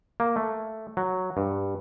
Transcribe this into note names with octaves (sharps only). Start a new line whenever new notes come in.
A#3
A3
F#3
G2